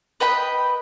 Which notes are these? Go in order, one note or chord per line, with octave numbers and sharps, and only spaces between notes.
B4 D#5 G5 B5